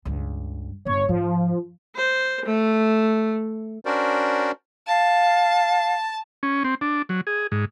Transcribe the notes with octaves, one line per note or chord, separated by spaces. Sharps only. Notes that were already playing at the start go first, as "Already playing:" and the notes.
C#2 G2
G1 C#3 C#5
G#2 F3
C5
A3
C#4 D4 F#4 A#4 C5 D5
F5 A5
C#4
C4
D4
F#3
G#4
G#2